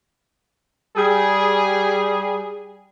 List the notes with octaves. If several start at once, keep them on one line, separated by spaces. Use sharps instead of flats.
G3 G#4